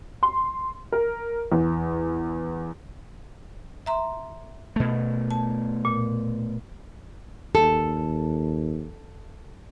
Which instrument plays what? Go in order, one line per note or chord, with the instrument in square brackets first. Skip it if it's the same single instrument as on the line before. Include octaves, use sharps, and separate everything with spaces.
[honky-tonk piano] C6
A#4
E2
[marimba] E5 A#5 C6
[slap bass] B2 A3
[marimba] A5
A#2
[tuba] D#2 [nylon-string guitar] A4